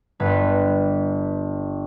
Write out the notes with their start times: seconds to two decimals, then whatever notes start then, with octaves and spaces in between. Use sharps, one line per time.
0.20 G1 B4